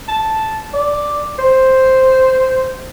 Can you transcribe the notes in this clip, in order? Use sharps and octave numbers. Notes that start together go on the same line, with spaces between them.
A5
D5
C5